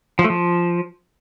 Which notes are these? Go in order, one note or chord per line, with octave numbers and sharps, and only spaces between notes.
F3
A3
F3